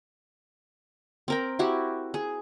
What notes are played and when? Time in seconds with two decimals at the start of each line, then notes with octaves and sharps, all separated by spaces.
1.28 C4 A#4 G5
1.59 E4 F#4 G4
2.14 G#4